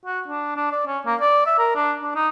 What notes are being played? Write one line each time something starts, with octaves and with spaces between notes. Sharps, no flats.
F#4
D4
D4
D5
C#4
A#3
D5
E5
A#4
D4
D4
D#4